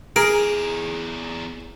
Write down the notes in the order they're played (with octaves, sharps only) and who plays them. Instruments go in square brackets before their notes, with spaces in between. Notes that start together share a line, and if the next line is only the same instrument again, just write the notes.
[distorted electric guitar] E2 A#5 [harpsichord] G#4 [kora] A#4 [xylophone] D7